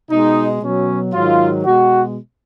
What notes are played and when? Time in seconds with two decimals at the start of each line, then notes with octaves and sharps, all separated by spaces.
0.10 B2 G#3 D#4
0.61 B2 F#3 C#4
1.14 G#2 D#3 F#3 F4
1.65 B2 G#3 F#4